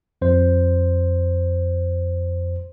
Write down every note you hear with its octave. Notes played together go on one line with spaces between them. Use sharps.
F2 C5